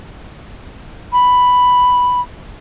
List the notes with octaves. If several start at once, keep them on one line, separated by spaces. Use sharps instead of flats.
B5